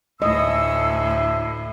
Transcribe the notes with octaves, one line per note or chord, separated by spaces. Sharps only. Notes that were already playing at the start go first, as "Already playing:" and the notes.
D2 A2 D#5 G#5 C#6 E6